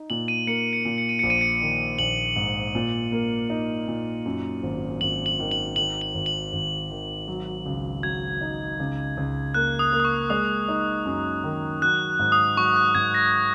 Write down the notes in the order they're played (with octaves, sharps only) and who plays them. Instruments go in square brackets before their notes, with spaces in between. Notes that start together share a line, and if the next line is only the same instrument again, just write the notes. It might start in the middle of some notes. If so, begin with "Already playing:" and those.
Already playing: [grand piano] D#4
[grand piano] A#2 [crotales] F#7
[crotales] D#7
[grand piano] A#3 [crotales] C#7
[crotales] C#7
[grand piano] A#2
[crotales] C#7
D#7
[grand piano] A#1 [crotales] C#7
[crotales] D#7
C#7
[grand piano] D#3
[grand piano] A#1 [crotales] F#7
[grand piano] G#2
A#2
A#3
D#4
A#2
F#2
G#1
[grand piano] G#1 [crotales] F#7
[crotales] F#7
[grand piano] D#3
[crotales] F#7
[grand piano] D#3 [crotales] F#7
[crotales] F#7
[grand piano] G#1
[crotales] F#7
[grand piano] G#1
D#3
F#3
C#2
[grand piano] F#3 [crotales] G#6
[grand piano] D#4
C#2
C#2
[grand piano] A#3 [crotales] F#6
[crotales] D#6
[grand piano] A#3
[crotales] D#6
C#6
[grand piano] G#3 [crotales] D#6
[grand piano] D#4
F#2
D#3
[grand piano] F#3 [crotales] F#6
[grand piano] G#2
[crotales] D#6
[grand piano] F#3 [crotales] C#6
[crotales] F#6
[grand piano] G#2 [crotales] G#6
[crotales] A#6